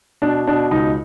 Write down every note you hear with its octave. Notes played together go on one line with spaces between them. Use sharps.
B2 D4
B2 D4
C#2 D#4